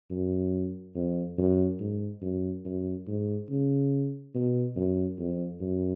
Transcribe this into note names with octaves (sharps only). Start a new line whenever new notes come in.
F#2
F2
F#2
G#2
F#2
F#2
G#2
C#3
B2
F#2
F2
F#2